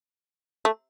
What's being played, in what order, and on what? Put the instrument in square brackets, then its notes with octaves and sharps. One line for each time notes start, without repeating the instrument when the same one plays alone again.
[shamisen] A3